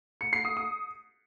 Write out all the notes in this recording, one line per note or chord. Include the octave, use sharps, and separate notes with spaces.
C#7
C7
D#6
D#6